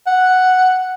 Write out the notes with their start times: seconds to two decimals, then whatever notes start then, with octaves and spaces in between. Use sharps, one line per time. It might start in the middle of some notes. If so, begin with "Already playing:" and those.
0.07 F#5